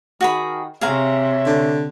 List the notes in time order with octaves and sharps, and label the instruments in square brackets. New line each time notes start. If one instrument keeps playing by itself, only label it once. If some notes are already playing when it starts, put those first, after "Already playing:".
[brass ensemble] D#3 [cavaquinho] F#4 G#4 B5
[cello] C3 [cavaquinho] G#4 F5 A#5 [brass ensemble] C#5 E5
[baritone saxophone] D3